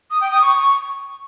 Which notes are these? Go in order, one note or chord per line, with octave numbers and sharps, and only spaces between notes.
D#6
G5
D#6
C#6